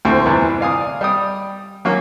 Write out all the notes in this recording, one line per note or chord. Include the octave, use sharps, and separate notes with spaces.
D2 A2 C4 C5
E2 G2 C3 E3
D5 F5 G#5 D#6
G3 G5 D#6
F#3 A#3 C#4